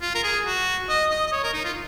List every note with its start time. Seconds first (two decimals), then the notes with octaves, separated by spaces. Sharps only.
0.01 F4
0.15 A#4
0.23 G#4
0.46 F#4
0.89 D#5
1.11 D#5
1.27 D#5
1.32 C#5
1.43 A#4
1.53 D#4
1.65 F4